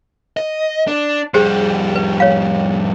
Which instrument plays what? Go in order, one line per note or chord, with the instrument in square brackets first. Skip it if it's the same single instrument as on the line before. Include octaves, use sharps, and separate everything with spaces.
[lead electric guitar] D#5
D4
[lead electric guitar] F2 G3 [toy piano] G4 G#4 C5
[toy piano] B4
C#5 F5